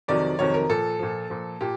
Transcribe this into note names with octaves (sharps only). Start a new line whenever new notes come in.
F2 C3 D#3 F#3 D5
F2 C3 D#3 F#3 C#5
A#4
A#2 F3 A4
A#2 F3
A#2 F3
A#2 G4